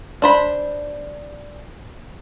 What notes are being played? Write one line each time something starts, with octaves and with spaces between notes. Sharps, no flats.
D4 C5 B5